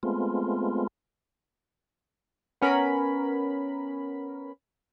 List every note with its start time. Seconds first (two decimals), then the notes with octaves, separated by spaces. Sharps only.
0.03 G#3 A3 B3 C4 F4
2.61 B3 C#4 A#4 B5